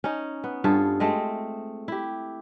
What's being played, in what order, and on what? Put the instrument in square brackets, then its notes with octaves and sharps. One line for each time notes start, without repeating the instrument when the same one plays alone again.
[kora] C#4 D#4
B3
G2 F4 G#4 A4
G#3 A3 C4 D#5
E4 G4